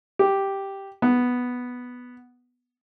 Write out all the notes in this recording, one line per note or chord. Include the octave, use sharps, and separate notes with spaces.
G4
B3